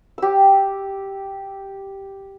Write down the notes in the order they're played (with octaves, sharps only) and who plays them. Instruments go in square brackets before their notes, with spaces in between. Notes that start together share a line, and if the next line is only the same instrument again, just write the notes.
[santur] G4 E6